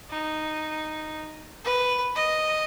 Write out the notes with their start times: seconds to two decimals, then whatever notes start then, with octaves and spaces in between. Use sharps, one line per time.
0.10 D#4
1.64 B4
2.15 D#5